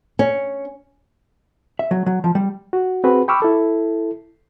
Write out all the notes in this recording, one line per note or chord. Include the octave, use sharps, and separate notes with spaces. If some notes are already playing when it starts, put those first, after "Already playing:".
C#4
E5
F#3
F#3
F3
G3
F#4
C4 F#4 G#4 B4
G5 B5 C#6 D6 E6 F6
E4 A4